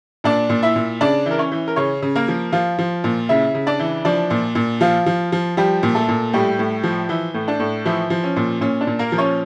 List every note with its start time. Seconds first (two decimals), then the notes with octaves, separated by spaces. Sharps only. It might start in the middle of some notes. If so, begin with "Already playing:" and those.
0.24 A#2 D4 D5
0.49 A#2
0.63 E4 E5
0.76 A#2
1.01 C#3 D4 D5
1.26 E3
1.31 A#4
1.39 C#4 C#5
1.52 E3
1.68 A#4
1.76 C#3 C#4 C#5
2.02 C#3
2.15 A#3 A#4
2.28 F3
2.52 F3 F4
2.78 F3
3.04 A#2
3.29 C#3 E4 E5
3.54 C#3
3.67 D4 D5
3.79 E3
4.05 F3 D4 D5
4.30 A#2
4.55 A#2
4.81 F3 F4
5.06 F3
5.32 F3
5.57 F3 G3 G4
5.83 A#2
5.95 A3 A4
6.09 A#2
6.33 A2 G3 G4
6.59 A2
6.83 F3
7.09 E3 E4
7.34 A2
7.48 D4
7.60 A2
7.85 E3 F3 E4
8.10 F3
8.24 C#4
8.36 A#2
8.61 A#2 C#4
8.81 D4
8.87 A#2
8.99 A#3 A#4
9.12 F3
9.18 C#4 C#5